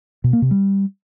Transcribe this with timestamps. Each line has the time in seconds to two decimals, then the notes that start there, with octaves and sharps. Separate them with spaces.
0.24 B2
0.33 A#3
0.42 C3
0.51 G3